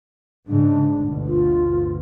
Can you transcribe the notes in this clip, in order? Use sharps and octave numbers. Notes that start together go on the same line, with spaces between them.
G#2 C#3 G#3 D4
G1 D2 B2
F4